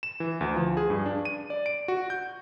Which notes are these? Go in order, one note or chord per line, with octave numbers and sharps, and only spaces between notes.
E7
E3
D2
F3
G#4
G2
D4
D#7
D5
D7
F#4
G6